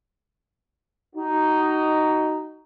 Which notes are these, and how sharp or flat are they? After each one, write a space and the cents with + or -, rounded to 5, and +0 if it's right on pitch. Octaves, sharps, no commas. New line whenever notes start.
D#4 +0 F#4 +30